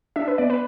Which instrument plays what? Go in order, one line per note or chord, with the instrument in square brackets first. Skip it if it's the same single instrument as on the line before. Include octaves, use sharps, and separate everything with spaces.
[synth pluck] D4 E5
B4
B3 D5
B4